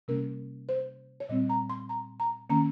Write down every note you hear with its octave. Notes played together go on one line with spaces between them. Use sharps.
C3 G3 A#3 C#4 A#4
C5
C#5
A#2 G3 C4 D#5
A#5
C6
A#5
A#5
D#3 A#3 C#4 A#5